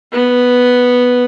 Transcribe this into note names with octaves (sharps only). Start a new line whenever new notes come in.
B3